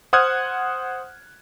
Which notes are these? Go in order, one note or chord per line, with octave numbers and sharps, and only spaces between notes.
C5 F#5 D#6 F6 F#6 G#6